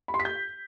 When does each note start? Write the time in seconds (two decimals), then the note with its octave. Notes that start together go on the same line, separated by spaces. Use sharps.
0.08 B5
0.14 C6
0.20 B6
0.25 G6